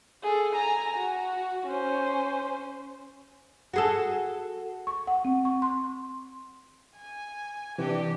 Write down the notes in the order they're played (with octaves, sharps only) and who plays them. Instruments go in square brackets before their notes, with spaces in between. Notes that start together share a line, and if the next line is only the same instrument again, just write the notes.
[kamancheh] G#4 A4
G#5 A#5
F#4
C#4 C5
[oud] F#4 G#4 A4
[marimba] C#6
F#5
C4
C#6
C6
[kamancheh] G#5
[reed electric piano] C3 E3 [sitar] G3 D4 F#4 [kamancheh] G4